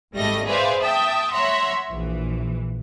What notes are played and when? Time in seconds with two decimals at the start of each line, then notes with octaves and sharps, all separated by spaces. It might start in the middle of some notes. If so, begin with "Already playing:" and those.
0.15 G#1 G#2 G3 A3 D#5 A#6
0.47 G#4 B4 C5 D5 E5 F5
0.81 E5 G5 A5 D#6
1.32 C#5 E5 F#5 A#5 C6
1.90 A#1 E3